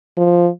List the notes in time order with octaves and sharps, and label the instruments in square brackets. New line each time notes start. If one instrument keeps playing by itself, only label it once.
[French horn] F3